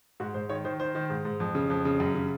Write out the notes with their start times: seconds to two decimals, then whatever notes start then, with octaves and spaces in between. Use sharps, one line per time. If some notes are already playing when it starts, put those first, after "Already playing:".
0.20 G#2 F#4
0.34 G#2 C5
0.49 D#3 C#5
0.65 D#3 C5
0.80 D#3 C5
0.95 D#3
1.10 G#2
1.25 G#2
1.40 F2
1.55 C#3
1.70 F2
1.85 C#3
2.00 F#2
2.15 C#3